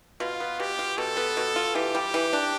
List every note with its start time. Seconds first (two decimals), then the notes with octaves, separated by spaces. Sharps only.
0.20 B2 F4
0.40 B3
0.60 B2 G4
0.79 F4
0.98 B2 A4
1.17 B3
1.37 B2
1.56 F4
1.75 E3 G4
1.95 G3
2.14 E3
2.33 D4